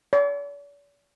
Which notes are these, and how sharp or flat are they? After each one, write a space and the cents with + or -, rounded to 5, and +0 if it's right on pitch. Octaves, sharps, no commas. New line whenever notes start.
D5 -45